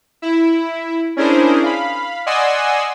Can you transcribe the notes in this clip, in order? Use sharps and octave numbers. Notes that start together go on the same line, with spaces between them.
E4
C#4 D4 E4 G#4 A#4 C5
F5 B5
D5 D#5 F#5 G#5 C6 E6